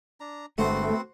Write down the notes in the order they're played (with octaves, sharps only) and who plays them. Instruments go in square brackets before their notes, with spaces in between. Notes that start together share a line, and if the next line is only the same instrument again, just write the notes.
[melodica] D4 A#5
[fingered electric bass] G1 D3 G#3 [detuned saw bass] A3 [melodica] B3 C4 [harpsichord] F#4 C5